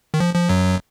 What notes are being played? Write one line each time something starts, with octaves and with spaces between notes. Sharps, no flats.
D#3
F3
F3
F#2 F#3